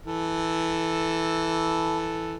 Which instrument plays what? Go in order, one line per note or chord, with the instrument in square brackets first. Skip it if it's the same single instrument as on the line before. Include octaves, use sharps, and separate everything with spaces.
[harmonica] E3 A4